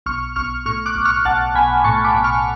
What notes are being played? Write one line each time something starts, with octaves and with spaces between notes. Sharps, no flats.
B1 C#6 F6
B1 C#6 F6
A2 C#6 F6
D6 F#6
B1
C#6 F6
B1 F#5 A5
B1 G#5 B5
A2 A5 C#6
B5 D6
B1
C#6 F6